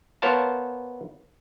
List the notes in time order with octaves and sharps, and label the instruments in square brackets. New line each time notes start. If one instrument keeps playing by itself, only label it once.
[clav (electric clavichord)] B3 A#4 C5 C#5 F5 A5